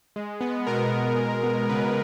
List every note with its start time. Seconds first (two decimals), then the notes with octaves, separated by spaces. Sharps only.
0.16 G#3
0.41 B3
0.67 B2 A#4
0.92 B2
1.17 G#3
1.43 B3
1.69 C#3 B4